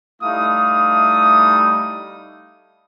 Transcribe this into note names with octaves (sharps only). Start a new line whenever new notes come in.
G3 A3 D#4 E4 F5 D#6